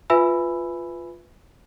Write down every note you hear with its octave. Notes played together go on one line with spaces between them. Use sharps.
F4 B4 E5 G#5 B5 E6